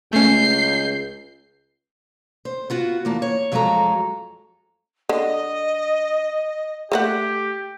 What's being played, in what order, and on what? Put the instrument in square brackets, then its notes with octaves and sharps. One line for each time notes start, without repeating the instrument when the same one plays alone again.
[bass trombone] C#2 [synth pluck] A3 C#4 [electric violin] G6 C7
[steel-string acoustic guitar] C5
B3 F4 F#4
E2 A#3 A5
C#5
F2 F#3 G#3 G#4 A4 A#5
[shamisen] D3 [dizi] D#5
[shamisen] A3 A4 F#5 [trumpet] G4